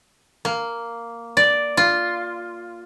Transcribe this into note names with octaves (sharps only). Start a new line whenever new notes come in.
A#3
D5
F4